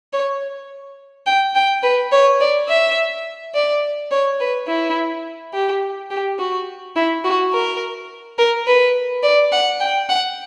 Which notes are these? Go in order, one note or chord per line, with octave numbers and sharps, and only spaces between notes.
C#5
G5
G5
B4
C#5
D5
E5
D5
C#5
B4
E4
G4
G4
F#4
E4
F#4
A#4
A#4
B4
D5
F#5
G5
F#5